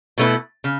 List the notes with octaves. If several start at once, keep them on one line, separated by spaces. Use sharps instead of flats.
B2 A3 C#4 E4 B4
C#3